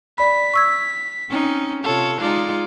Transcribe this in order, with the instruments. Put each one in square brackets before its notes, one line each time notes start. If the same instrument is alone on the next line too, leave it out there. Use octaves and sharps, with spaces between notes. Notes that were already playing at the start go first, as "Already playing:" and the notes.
[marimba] D5 B5 [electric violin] B6
[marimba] C#6 E6 G#6
[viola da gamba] C4 C#4 D#4
[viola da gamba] C3 F4 C#5 [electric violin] A4
[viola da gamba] G#3 D#4 F4 [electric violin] D5